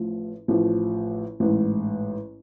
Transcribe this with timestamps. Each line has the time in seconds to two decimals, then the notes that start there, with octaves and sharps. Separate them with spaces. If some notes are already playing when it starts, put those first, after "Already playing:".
Already playing: A1 A2 F3
0.48 A1 A2 F3
1.40 A1 G#2 E3